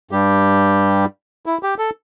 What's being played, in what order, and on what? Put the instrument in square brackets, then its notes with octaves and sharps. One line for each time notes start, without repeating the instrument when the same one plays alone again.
[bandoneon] G2 G3 G4
E4
G4
A4